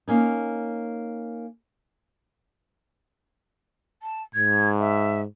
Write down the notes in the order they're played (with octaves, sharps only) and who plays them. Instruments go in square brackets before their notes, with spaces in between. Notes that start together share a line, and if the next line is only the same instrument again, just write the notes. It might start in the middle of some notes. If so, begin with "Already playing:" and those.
[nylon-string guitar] A#3 C#4 D#4
[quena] A5
[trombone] G#2 [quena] G#6
[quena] E5